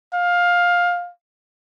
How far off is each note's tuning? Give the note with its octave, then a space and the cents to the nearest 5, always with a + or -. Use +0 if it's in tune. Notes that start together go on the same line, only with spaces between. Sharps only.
F5 +15